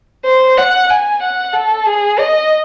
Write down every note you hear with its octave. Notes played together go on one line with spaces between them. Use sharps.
C5
F#5
G#5
F#5
A4
G#4
D#5